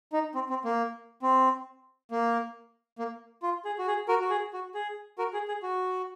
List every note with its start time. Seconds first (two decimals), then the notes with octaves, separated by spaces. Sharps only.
0.13 D#4
0.35 C4
0.49 C4
0.65 A#3
1.22 C4
2.11 A#3
2.99 A#3
3.43 F4
3.65 G#4
3.78 F#4
3.87 G#4
4.08 F#4 A#4
4.20 F#4
4.30 G#4
4.53 F#4
4.74 G#4
5.18 F#4 A#4
5.33 G#4
5.48 G#4
5.63 F#4